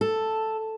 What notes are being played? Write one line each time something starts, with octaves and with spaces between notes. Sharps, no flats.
A4